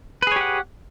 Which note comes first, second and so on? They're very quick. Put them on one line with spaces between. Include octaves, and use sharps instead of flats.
B4 G#4 C#5 G4 F#5